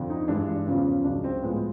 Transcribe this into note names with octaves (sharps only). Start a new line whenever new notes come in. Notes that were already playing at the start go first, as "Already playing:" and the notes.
Already playing: F2 D3 F3
D#4
G2 E3 G#3 D4
D4
E2 C#3 F3 C#4
C#4
C#2 C#3 F#3 D4
C4
A2 F3 G#3 B3